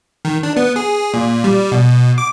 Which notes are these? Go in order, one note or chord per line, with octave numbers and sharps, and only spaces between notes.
D#3
D4
B3
G#4
A#2
G3
B2
D6